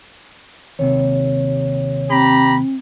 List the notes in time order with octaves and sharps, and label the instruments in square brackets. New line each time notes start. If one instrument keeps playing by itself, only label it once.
[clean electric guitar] D#2 C3 [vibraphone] C#5
[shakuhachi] C4 [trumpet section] G4 A#5 B5